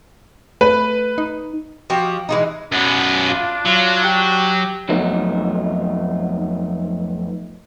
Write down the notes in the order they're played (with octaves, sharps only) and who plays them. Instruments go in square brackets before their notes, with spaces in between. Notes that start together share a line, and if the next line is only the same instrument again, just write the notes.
[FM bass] A3 [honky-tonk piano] B4
[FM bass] D#4
[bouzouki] F3 F#4 G4 D#5
E3 G#3 D#4
[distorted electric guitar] F#2 B3 [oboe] D4
[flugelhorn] F4
[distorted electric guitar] F#3 [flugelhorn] F4
[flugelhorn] G4
[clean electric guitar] F2 F#3 A3 B3 D#4